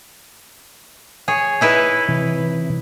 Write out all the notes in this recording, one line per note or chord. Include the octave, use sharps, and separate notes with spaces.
G#4 C#5
D#4 E4 B4
C3 E3